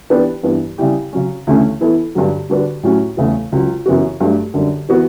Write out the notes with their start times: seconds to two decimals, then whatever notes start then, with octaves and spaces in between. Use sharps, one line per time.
0.10 E3 B3 D4 G4 B4
0.43 G2 E3 B3
0.78 C#3 G3 C#4 E4 G4
1.13 C#3 F#3 C#4
1.47 D2 C#3 E3 A3 C#4
1.81 E3 B3 E4 A4
2.15 G2 D3 F#3
2.50 D3 G3 D4 F#4 B4
2.83 A2 F#3 C#4 F#4
3.17 E2 C#3 E3 A3
3.52 C#2 C#3 F#3
3.86 F#2 C#3 E3 B3 F#4
4.20 G2 F#3 A3 D4
4.54 F#2 D3 G3
4.89 E3 B3 F#4 B4